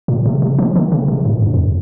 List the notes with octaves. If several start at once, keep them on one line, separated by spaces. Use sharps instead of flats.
A#2
C3
C3
F3
D#3
C#3
C3
G#2
G2
F2